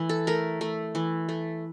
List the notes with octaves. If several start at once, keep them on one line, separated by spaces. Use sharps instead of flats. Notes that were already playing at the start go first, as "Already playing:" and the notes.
Already playing: E3 A3
A4
A3 A#4
A3
E3
A3